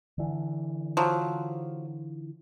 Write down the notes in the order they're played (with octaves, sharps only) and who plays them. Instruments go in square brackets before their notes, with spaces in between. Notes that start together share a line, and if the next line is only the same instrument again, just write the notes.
[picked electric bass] D3 E3
[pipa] F3 F#3